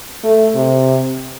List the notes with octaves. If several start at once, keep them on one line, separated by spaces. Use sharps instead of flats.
A3
C3